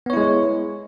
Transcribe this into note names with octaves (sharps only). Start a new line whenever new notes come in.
G#3 B3 E4 C#5